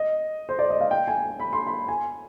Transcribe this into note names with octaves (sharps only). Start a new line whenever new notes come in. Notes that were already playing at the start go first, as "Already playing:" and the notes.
Already playing: D#5
C5
D5
D#5
F5
G5
G#5
B5
C6
B5
G#5